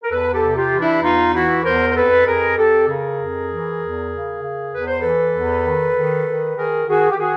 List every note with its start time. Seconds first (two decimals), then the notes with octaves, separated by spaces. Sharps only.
0.03 A#4
0.10 E2 A4 B4
0.34 G4 A4
0.41 C3
0.57 F4 G4
0.72 E3
0.80 D4 E4
1.03 E2 D#4 F4
1.33 E3 E4 F#4
1.64 E2 A#4 C5
1.90 C5
1.95 F2 A4 B4
2.26 F2 G#4 A#4
2.57 F2 G4 A4
2.87 C#3 G#4 A#4
3.19 F2
3.50 E3
3.81 E2
4.11 C#3
4.42 C#3
4.73 E2 B4
4.86 C5
5.00 E3 A4 B4
5.34 E2
5.65 D#3
5.95 D#3
6.27 D#3
6.57 D#3 G#4 A#4
6.88 D#3 F#4 G#4
7.11 G4
7.18 D#3 F#4 G#4